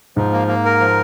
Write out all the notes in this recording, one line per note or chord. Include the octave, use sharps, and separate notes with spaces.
G#2 F3
A#3
A#3
A#4
F3